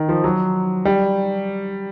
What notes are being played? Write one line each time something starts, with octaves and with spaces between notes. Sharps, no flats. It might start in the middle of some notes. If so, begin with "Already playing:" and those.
Already playing: D#3
F3
F#3
G3